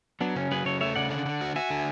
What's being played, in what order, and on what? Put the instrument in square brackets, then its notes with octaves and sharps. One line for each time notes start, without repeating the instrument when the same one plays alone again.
[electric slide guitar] F#3 [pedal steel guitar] B3 D4
[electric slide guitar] C#3 [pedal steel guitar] C#4
[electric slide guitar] F#3 [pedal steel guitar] G#4 B4
[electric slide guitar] C#3 [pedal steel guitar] A4 C#5
[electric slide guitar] A3 [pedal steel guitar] C#5 E5
[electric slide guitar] C#3 [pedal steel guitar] D5 F#5
[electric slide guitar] D3 [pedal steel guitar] D5 F#5
[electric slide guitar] D3
F#4
[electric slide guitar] F#4 [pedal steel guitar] E5 G#5
[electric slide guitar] D3